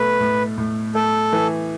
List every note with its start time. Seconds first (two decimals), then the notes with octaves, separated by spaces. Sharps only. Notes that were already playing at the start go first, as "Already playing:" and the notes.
Already playing: B2 A3 B4
0.20 A2
0.58 A2
0.95 A3 A4
1.33 E3